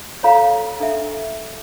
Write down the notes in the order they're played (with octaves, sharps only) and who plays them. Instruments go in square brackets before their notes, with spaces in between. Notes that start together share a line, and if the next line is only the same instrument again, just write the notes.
[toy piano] F4 A4 C#5 F5 A#5
D4 A4 E5